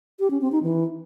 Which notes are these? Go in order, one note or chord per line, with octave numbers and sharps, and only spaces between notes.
G4
C#4
C4
D#4
E3